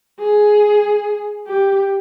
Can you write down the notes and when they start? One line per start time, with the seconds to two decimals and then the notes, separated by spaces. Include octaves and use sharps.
0.19 G#4
1.46 G4